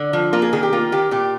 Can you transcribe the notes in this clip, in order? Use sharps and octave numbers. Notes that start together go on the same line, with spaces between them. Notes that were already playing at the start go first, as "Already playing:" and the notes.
Already playing: D3
F3
A#3 F4
G#4
D#3 G#4
G4
A#3 F4
D#3 G4
A#2 G4